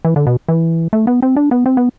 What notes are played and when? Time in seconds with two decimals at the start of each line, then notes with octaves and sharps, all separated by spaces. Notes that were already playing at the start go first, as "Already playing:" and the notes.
0.05 E3
0.16 D3
0.27 B2
0.48 E3
0.93 A3
1.07 B3
1.22 C4
1.37 D4
1.51 B3
1.66 C4
1.77 B3